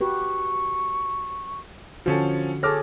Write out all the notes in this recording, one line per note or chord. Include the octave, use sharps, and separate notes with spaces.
F#4 G4 B4 C#6
D3 F3 C#4 F#4 A4
G#4 A4 C#5 D6 F6 A#6